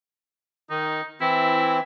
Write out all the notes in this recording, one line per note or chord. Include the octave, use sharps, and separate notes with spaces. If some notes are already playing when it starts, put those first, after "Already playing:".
D#3 D#4
E3 C4 E4